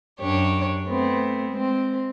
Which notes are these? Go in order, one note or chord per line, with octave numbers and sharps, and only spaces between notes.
F#2 D4 G4 C#5
A3 B3 C4
G#3 C4